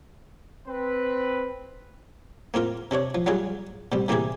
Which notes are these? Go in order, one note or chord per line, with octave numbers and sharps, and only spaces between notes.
C4 B4
A#3 C4 F4 A#4
C3 C4 D4 C#5
F3
F#3 G3 F4 F#4 G#4
B2 G3 C4
C3 E3 A#3 C4 G4 G#4